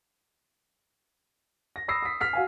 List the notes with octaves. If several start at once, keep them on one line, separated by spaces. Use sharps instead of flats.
A#6
B5 D#6 E6 A#6 C7
D#6 B6
F6 B6 C7
F#4 F5 G#5